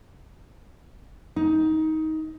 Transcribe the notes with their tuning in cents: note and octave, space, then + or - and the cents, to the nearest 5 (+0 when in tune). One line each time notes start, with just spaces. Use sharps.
D#4 +20